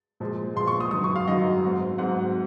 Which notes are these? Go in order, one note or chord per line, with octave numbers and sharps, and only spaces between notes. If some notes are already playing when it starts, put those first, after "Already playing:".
A#2 F3 G#3
A#2 F3 G#3 C6
C#6
D#6
F#2 D#3 F#3 D#6
C#6
F5
F#2 D#3 F#3 D#5
G#2 F#3 C4
G#2 F#3 C4 F#5